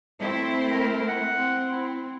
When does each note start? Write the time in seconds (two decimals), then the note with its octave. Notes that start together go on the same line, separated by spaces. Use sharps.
0.20 A3 C4 E4
0.71 A#4
1.08 F#5
1.38 C4
1.72 E4